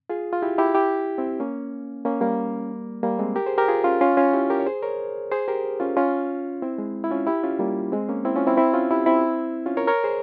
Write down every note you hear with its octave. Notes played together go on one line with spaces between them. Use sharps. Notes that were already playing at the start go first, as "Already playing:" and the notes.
F4 G#4
F4
E4 G4
E4 G4
E4 G4
C4 E4
A#3 C#4
A#3 C#4
G3 A#3
G3 A#3
G#3 C4
G4 A#4
G#4 C5
G4 A#4
F4 G#4
C#4 F4
C#4 F4
C#4 F4
E4 G4
G4 A#4
C#5
G#4 C5
A#4 C#5
G#4 C5
G4 A#4
C#4 F4
C#4 F4
C4 E4
G#3
E4
C#4 F4
E4 G4
C#4 F4
G3 A#3
G#3 C4
A#3 C#4
C4 E4
C#4 F4
C4 E4
C4 E4
C#4 F4
E4 G4
C4 E4
C#4 F4
A#4 C#5
A#4 C#5
G#4 C5